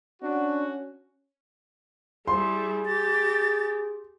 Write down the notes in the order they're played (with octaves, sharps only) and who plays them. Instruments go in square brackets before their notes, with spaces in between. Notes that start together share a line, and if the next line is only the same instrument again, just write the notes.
[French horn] C#4 [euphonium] D4 [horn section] F#4
[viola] G3 E4 [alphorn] G#4 [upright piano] C6
[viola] G4 [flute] A6